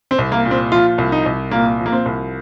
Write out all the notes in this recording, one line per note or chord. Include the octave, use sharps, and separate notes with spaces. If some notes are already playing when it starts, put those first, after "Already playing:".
C4
C2
A#3
A#2
C4
F3 F4
C2
D#4
C2
A#2 A#3
F3
A#3
C4
C2